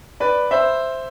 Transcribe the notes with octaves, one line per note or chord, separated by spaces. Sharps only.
B4 D5
C5 E5